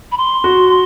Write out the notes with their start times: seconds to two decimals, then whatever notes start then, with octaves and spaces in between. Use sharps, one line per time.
0.12 B5
0.18 C6
0.44 F#4